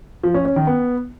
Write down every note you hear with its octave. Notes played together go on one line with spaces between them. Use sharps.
F3
C#4
C#4
D#3
B3